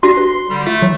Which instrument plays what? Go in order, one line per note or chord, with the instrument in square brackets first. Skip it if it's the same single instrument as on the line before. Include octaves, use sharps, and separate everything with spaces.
[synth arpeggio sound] D4 G4 A#6 [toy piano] F#4 [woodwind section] C6
[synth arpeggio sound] B4
[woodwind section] D3 G3
[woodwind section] A3 [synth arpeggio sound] F4
[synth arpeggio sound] D3 E3 F#3